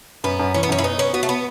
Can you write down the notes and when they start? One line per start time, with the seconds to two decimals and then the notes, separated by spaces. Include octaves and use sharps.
0.24 F#2 B3
0.39 F#2
0.54 E3 C#4
0.63 B3
0.69 F#2 C#4
0.78 E4
0.84 B3 D#4
0.98 B3 C#4
1.13 B3 F#4
1.23 A3
1.29 B3